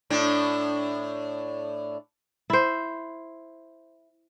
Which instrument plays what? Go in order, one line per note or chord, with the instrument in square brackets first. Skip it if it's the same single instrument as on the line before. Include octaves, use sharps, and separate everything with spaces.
[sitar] A2 D4
[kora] E4 C5